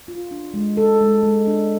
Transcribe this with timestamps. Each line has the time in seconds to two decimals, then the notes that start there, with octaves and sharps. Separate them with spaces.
0.08 F4
0.31 D4
0.54 G#3
0.77 A4
1.01 G#3
1.23 G#3
1.47 D4